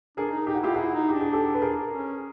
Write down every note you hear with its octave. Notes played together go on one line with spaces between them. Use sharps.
D4 G#4 A#4
D#4
D#4 G4
F#4
E4 F4 G4
E4 F#4 G#4
D#4
D4 G4
G#4
G4 A4
B4
G#4 A#4
C#4